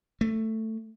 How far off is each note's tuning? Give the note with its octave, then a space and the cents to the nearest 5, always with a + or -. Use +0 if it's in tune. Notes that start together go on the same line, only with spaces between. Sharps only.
A3 +10